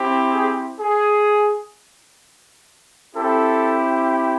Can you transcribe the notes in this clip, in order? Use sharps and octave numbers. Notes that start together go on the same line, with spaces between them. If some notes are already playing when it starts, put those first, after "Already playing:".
Already playing: C4 E4 G4
G#4
G#4
C4 E4 G4 A4